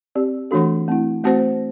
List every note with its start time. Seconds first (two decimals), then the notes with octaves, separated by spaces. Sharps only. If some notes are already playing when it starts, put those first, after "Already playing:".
0.15 C4 G4 D5
0.51 E3 A3 D4 F#4 A4
0.88 A3 C4 E4
1.24 A3 C4 F#4 C5